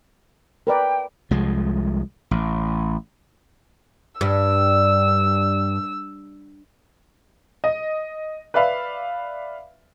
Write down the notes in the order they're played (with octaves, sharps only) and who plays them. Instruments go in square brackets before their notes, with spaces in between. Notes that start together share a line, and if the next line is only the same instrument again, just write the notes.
[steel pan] A#4 B4 D5 [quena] G5
[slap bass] C2 F3 G#3
A1
[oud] G2 [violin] E6
[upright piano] D#5
B4 D5 E5 F5 B5